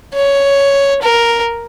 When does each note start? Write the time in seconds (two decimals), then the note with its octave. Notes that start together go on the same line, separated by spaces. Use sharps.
0.14 C#5
1.02 A#4